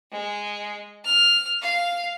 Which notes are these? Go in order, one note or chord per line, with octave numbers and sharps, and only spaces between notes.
G#3
F6
F5